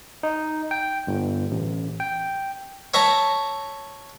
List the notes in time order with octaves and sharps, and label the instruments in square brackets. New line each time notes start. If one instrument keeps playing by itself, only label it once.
[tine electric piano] D#4
G5
G1
A1
G5
[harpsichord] C#5 E5 A5 A#5